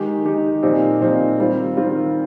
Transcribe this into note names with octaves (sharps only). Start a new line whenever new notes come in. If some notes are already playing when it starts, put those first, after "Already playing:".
Already playing: D#3 G#3 D#4 G4
D#3 G#3 D#4 G4
A#2 F3 C4 D#4 G4
A#2 F3 C4 D#4 G4
D#3 G3 C4 F4
D#3 G3 C4 F4